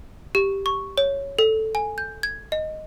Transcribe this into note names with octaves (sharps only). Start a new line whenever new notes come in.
G4
C#6
C#5
A4
G#5
G6
G#6
D#5